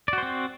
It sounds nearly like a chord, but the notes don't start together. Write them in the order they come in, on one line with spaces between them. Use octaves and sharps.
D5 F#4 C5 C4